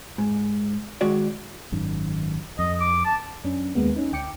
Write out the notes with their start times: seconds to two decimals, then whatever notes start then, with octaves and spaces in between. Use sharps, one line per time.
0.18 G#2
1.01 D#3 G#3 F#4 C#5 D5
1.72 G#1 F#2 D#3
2.59 F2 D#5
2.81 D6
3.05 A5
3.44 F#2 C#4 D4
3.75 D#2 G#3 A#3 B3
3.96 C#4 D#4
4.12 D2 G5 D6 C#7